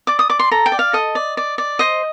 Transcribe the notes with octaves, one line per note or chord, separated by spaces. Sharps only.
D5 D6
D#6
D5 D6
C6
A4 A#5
G5
D5
F5
A4 D#5
D5
D5
D5
C5 D#5